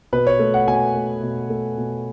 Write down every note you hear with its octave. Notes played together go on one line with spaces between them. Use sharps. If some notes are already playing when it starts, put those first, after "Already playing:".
B2 B4
C#5
A3
F#5
B2 G#5
A3
B2
A3
B2